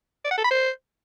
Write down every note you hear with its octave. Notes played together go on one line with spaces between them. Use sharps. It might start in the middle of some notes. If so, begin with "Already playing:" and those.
D5
F#5
A4
B5
C5